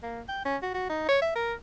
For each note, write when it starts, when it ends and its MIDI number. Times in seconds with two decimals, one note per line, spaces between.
0.03 0.22 58
0.29 0.44 79
0.45 0.57 61
0.63 0.70 66
0.74 0.89 66
0.90 1.06 63
1.09 1.20 73
1.22 1.32 76
1.35 1.54 70